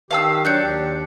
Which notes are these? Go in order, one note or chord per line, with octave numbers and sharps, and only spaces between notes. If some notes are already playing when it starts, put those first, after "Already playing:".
D#3 G4 F5 A5 E6
F#3 D4 F#6 G6 C#7
D#2 G4